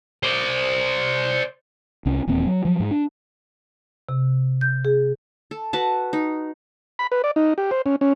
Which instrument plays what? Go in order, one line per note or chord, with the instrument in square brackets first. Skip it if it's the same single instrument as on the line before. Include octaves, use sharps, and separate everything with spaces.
[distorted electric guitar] C5 D5
[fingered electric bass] C2 C#4
D#1 E2 A#3 C4
F#3
F3 F#3
G#2
D4
[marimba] C3
G6
G#4
[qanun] A4
F#4 B4 F#5 A5
D#4
[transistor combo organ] B5
B4
D5
D#4
G4
C5
C#4
C#4